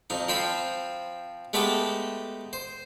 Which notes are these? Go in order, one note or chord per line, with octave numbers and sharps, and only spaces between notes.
F2 D#4
F3 C4 C5 B5
G#3 A3 B3 G4 A4
C5